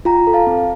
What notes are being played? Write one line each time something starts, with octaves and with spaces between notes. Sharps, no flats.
F4 G5 A#5
A4
F5 A5
C4